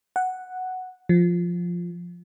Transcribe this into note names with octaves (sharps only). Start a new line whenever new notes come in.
F#5
F3